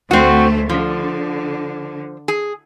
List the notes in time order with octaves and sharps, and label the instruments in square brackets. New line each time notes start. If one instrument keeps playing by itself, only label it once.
[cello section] D2 A3 C5 [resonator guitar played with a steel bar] C4 F#4
[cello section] D3 [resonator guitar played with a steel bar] F3
[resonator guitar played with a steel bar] G#4